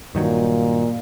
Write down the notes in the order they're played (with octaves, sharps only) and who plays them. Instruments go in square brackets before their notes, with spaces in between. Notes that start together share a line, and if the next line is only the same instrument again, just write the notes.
[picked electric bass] G2 D#3 F#3 [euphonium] A#2